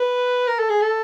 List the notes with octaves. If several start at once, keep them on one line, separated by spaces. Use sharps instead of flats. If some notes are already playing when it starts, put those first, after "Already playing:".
Already playing: B4
A#4
A4
G#4
A4